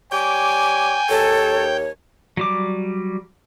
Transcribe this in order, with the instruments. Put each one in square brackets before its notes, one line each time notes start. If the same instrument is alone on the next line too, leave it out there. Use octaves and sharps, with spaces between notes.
[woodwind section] G3 C#5 D6 [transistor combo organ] G5 [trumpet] G#5
[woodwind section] D#2 C#5 [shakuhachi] A4
[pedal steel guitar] F#3 G3 D6